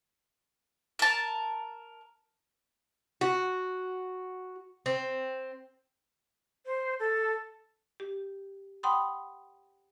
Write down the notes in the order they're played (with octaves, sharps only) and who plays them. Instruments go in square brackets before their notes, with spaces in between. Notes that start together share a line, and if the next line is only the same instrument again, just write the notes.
[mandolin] A#4 A5
[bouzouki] F#4
C4
[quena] C5
A4
[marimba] G4
F#5 G5 B5 C6 D#6